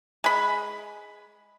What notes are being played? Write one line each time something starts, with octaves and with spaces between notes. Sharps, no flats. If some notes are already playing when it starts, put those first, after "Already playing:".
G#3 B5